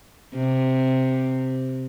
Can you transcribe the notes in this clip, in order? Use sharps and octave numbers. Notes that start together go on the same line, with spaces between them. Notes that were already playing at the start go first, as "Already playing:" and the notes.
C3